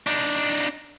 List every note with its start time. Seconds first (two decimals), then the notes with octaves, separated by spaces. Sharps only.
0.07 D4 D#4